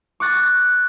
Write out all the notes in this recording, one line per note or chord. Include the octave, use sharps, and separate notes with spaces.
C#6 D6 F#6 A6